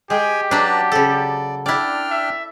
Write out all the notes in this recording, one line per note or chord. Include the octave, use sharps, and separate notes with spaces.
G#3 G4 G5 G#5
F#3 D4 B4 A5 A#5
C#3 A4 D5
D4 E4 D5 G5 F6
E5